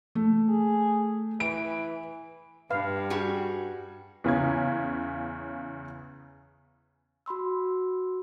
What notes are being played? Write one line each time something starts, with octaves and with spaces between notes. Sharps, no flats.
A3
G#4
E3 D7
G2 B4 F5
G3 F#4 G#4
E2 C#3 C#4 G#6
F#4 B5 C6 E6